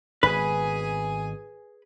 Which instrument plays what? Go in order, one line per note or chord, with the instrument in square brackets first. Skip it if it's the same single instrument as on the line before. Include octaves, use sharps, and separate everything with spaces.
[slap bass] G#1 B2 [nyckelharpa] G#4 G#5 [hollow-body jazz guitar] B4